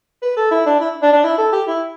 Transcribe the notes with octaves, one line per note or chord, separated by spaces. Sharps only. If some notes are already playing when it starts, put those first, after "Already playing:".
B4
A4
E4
D4
E4
D4
D4
E4
A4
G4
E4